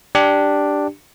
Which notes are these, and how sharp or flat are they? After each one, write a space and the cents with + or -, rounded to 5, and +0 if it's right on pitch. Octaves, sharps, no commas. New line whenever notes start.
D4 +0 G4 +0